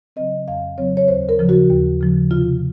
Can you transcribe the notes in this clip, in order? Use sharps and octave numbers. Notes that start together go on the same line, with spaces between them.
C#3 F#3 C4 D#5
F2 F5
C#3 F#3 C4 C#5
C#5
D#2 C5
A#4
C#3 F3
F#4
D#2
C#3 F3
C3 F4